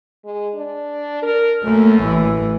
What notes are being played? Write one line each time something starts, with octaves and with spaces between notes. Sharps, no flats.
G#3
D4
A#4
F#2 A3 A#3
A1 E3